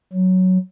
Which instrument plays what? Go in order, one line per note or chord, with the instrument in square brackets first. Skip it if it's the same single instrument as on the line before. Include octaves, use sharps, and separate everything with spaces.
[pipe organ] F#3